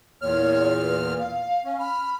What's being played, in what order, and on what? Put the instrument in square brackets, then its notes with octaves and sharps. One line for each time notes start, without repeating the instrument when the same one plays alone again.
[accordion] E2 A#2 F6 [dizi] C#5
[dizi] B4
F5
[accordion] C#4
[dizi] B5 [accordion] F6